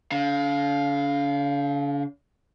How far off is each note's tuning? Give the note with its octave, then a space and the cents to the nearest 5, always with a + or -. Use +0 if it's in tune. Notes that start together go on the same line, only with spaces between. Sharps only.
D3 -45 F5 +0